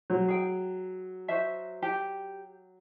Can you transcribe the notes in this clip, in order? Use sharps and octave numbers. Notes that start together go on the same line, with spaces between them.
F#3
G#4 G5
F#4 C5 E5
G4